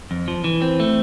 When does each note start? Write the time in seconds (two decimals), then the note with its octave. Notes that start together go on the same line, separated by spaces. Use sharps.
0.11 F2
0.28 F3
0.44 E3
0.62 C4
0.80 A3